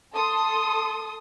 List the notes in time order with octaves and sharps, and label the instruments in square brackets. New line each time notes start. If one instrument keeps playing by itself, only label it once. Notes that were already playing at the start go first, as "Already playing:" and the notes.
[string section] A4 C6 D#6